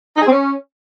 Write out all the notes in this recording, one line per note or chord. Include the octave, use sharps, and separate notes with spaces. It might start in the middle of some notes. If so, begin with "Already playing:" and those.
D#4
G#4
C4
C#4